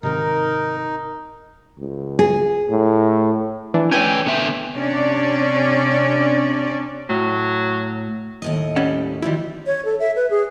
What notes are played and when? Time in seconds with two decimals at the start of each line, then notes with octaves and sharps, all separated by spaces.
0.03 G#2 C3 D#3 D#4 A#4
1.78 C#2
2.19 G#4
2.70 A2
3.74 E3 D4
3.91 C#4 B4 C#5 G5 G#5
4.26 D3 B3 E5
4.75 C3 C#4 D4 D5
7.09 A2 F#3
8.42 D#2 A2 D#5
8.76 G3 C#4 F#5
9.22 D#3 F3 G3 E4 F#4
9.67 C#5
9.85 A4
9.99 E5
10.16 B4
10.30 G#4